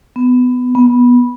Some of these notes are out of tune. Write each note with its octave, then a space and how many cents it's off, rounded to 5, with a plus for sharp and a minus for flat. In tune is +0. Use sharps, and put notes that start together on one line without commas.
B3 +15
B3 -15